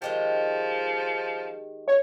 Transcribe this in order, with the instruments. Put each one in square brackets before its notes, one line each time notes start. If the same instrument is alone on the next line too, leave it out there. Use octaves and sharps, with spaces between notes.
[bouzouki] D#3 G#3 G4 [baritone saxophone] F3
[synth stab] C#5